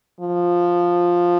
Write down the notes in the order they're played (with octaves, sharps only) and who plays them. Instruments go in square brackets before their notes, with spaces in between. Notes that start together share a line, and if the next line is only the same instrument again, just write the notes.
[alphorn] F3